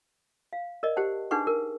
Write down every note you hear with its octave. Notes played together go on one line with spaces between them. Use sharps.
F5
A#4 D5 D#5
G4 C5 F#5 A5
D4 D#4 G#4 B4 F#5 C#6
A#4